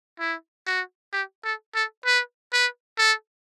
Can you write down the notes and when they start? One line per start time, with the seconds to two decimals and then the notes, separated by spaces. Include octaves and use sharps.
0.20 E4
0.66 F#4
1.12 G4
1.44 A4
1.75 A4
2.05 B4
2.52 B4
2.98 A4